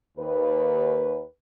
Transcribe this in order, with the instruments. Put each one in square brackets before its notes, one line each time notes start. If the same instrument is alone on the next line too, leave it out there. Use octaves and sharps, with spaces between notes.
[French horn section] D#2 B4